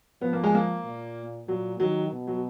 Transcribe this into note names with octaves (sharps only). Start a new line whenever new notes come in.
F3 B3
A#3
G#3
A#3
A#2
A#2 F#3
D#3 F#3
B2
F#3